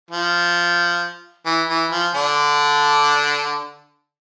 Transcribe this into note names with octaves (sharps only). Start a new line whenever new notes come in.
F3
E3
E3
F3
D3 D4